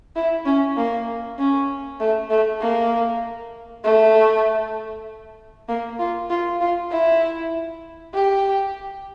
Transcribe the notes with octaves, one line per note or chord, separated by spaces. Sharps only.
E4
C#4
A#3
C#4
A3
A3
A#3
A3
A#3
F4
F4
F4
E4
G4